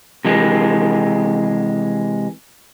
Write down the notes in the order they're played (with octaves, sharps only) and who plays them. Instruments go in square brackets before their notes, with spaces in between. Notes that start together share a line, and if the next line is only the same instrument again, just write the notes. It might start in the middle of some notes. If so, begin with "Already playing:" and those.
[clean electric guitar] C3 E3 G#3